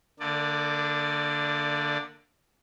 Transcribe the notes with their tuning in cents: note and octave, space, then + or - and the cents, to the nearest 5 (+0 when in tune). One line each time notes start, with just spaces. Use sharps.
D3 +0 A#3 -35 D5 +10